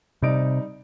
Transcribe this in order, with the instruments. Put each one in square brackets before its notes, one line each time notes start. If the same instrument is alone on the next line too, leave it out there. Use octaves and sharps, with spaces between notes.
[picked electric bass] C3 [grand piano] G3 D#4 D7